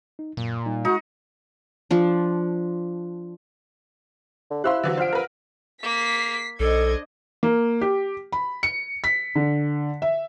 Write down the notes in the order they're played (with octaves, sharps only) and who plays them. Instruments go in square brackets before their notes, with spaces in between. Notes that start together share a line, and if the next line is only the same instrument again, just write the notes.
[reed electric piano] D#4
[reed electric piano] F#2 [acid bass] A#2
[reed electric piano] G3 D#4
[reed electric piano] G#3 [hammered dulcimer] D#4 [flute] F#4
[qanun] F3 D4
[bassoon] D3
[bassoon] E4 [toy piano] G4 C5 F5 [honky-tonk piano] C6 E6 F#6
[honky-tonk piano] D3 E3 F#3
[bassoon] F3 [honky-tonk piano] C5 F6 D7 [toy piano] D5 F#5
[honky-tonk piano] A#4 B4
[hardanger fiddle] A#3 [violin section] B6 C7
[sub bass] B1 [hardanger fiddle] D4 [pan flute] A4 [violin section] C5 D#5 G#6
[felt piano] A#3
G4
B5
C#7
B6
D3
E5